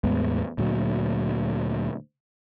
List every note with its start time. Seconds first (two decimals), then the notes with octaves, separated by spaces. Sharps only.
0.04 E2 A2 G#3 B3
0.58 D2 A#2 F#3